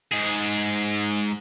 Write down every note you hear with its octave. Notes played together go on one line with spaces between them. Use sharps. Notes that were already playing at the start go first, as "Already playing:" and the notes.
G#2 G#4